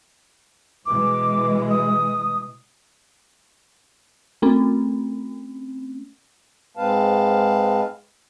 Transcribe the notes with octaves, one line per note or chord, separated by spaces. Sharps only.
B2 E3 G#3 D6
D#6
A3 C4 C#4
G#2 G#3 C4 B4 F5 A5